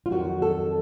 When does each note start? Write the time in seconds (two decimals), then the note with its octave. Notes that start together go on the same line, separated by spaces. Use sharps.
0.06 F4
0.10 F2 D#3 F#3 F#4
0.42 A4